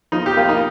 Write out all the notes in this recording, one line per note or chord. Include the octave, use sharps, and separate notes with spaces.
F3 D#4
G4
A#3 F4
D#4